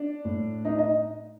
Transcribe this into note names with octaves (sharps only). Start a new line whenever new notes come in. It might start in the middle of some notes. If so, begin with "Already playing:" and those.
Already playing: D4 D5
A2
D#4 D#5
D#4 D#5